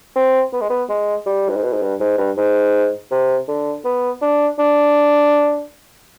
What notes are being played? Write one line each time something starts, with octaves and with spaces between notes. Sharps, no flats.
C4
B3
G#3
B3
G#3
G3
G2
G#2
B2
G#2
G2
G#2
G2
G#2
C3
D3
B3
D4
D4